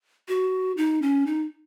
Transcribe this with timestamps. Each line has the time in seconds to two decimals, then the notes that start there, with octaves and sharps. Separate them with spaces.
0.28 F#4
0.77 D#4
1.02 C#4
1.27 D#4